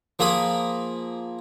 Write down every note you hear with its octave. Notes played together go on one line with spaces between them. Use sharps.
F3 A#3 G#4 B5 D#6